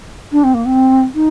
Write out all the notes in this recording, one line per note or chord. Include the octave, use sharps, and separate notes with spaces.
D4
C4
A#3
C4
D#4